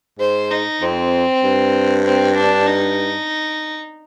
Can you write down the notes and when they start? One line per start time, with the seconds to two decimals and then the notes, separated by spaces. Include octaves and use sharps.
0.19 G#2 C5
0.51 D#4
0.82 F2 C4
1.43 G2
2.05 C4
2.36 D4
2.67 D#4